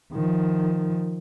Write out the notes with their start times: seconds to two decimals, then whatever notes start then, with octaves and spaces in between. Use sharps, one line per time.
0.13 D#3 F3